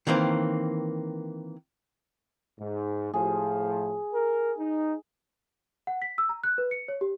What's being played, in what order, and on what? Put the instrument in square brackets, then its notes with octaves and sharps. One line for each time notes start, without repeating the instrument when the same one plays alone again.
[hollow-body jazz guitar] D#3 E3 A#3 C4
[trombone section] G#2
[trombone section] A2 F3 [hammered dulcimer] G#4
[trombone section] A#4
D#4
[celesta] F#5
B6
E6
A#5
F#6
B4
C#7
C#5
G4